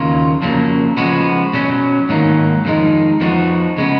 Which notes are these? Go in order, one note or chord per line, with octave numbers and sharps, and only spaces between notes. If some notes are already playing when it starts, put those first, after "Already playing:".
Already playing: D#2 C#3 F#3 A#3 F4
F2 C#3 F#3 A#3
C#3 F3 G#3 B3 F#4
B2 F#3 C#4
G#2 D#3 F#3 A#3
F2 D#3 G#3 D#4
F2 F3 B3 D#4 F#4
C#3 G#3 B3